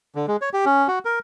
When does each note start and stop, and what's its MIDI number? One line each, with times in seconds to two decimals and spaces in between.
0.15 0.26 50
0.28 0.37 56
0.41 0.49 73
0.53 0.65 67
0.65 0.88 61
0.88 0.99 66
1.05 1.19 70